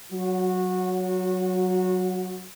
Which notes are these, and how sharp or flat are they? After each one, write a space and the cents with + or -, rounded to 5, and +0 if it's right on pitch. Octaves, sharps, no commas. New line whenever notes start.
F#3 +10 F#4 -20